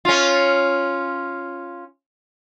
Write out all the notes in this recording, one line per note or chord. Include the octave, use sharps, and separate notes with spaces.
C#4 F4